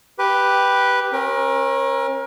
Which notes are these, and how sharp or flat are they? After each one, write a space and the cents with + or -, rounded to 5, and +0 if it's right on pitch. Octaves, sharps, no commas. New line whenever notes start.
G4 +0 B4 +0
C#4 -35 A#4 +30